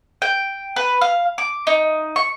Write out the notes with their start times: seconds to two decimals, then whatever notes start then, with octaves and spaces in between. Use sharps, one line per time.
0.22 G5
0.76 B4
1.01 F5
1.38 D6
1.67 D#4
2.16 C#6